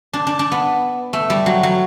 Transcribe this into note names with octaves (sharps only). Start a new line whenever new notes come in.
D4
D4
D4
B3
A3
G3
F#3
F#3